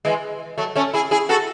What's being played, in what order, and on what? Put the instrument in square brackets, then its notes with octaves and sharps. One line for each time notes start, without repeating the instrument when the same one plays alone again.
[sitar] E3 G#3
F#3 A3
A3 C#4
E4 G#4
E4 G#4
F#4 A4